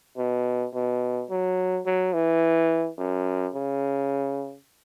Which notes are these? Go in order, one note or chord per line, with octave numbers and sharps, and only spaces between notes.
B2
B2
F#3
F#3
E3
F#2
C#3